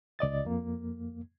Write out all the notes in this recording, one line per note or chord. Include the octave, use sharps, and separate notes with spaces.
C#2 D5 D#5 A6
F2 A#3